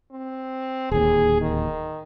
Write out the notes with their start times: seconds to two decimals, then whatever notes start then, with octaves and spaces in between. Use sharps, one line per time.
0.11 C4
0.91 D1 D#2 G#4
1.42 D#3